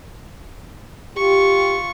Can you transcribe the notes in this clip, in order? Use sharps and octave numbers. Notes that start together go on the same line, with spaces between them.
F4 G4 C#6